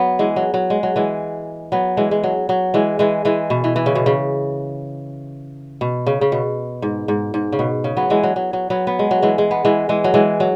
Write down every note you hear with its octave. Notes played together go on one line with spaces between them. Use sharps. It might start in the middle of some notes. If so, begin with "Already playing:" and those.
Already playing: F#3 B3
E3 G#3
F#3
F#3
G#3
F#3
E3 G#3
F#3 B3
E3 G#3
G#3
F#3
F#3
E3 G#3
E3 G#3
E3 G#3
B2
E3
E3
C#3
B2
C#3
B2
C#3
C#3
B2
G#2
G#2
G#2
C#3
B2
C#3
F#3 B3
E3 G#3
F#3
F#3
F#3
F#3 B3
B3
G#3
F#3
E3 G#3
G#3
B3
E3 G#3
E3 G#3
F#3
E3 G#3
F#3